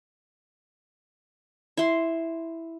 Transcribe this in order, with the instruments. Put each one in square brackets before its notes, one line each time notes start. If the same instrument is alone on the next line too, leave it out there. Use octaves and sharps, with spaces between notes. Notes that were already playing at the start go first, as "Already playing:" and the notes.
[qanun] E4 C6